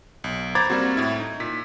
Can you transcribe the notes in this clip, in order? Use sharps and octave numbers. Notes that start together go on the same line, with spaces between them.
B1
C5 A#5 B5 D6 G#6 A6
G3 A#3 C4 F#4
A2 E4
D#4
A#2 B6